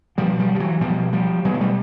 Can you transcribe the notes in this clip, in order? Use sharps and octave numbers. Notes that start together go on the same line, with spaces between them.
B2 F3 G3
F3 G3
F3
E3 F#3
B2 F3 G3
F3 G3
B2 F#3 G#3
A#3
G3 A3